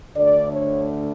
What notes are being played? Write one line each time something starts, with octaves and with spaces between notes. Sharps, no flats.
D2 D3 A3 D4 D5
C#5